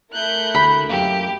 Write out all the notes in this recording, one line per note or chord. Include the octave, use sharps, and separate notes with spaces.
A3 E4 A#4 F#6 G6
D2 B5
F#2 A#3 G4